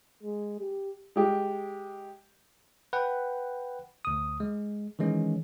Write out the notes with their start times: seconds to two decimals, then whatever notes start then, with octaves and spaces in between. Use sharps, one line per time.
0.23 G#3
0.60 G4
1.16 G#3 G4
2.93 B4 F#5 G5
4.05 D2 D#6
4.40 G#3
4.99 D#3 E3 G#3 C#4